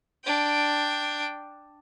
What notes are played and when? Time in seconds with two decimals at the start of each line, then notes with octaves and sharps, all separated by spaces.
0.24 D4 G5